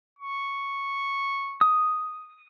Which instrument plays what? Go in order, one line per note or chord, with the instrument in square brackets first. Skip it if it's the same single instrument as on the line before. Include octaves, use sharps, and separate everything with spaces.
[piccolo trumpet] C#6
[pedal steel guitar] D#6